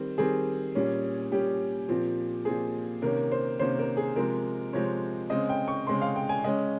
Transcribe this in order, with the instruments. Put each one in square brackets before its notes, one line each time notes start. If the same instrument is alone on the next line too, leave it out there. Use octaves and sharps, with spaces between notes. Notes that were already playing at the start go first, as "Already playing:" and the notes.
Already playing: [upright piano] D#3 G3 C4
D#3 G3 C4 G#4
A#2 G3 C#4
A#2 G3 C#4 G4
A#2 F3 C4
A#2 F3 C4 G#4
C3 D#3 A#3 C#4 A#4
C5
C3 D#3 A#3 C#4 C5
A#4
G#4
C3 F3 G#3 C4 A#4
C3 F3 G#3 C4 C#5
C#3 G#3 C4 D#5
G5
C#6
C#3 G#3 C4 C6
F5
G5
G#5
C#3 G#3 C#4 D#5